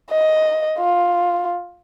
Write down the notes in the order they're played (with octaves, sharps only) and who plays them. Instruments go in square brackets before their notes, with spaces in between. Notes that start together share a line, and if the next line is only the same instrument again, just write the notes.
[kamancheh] D#5
F4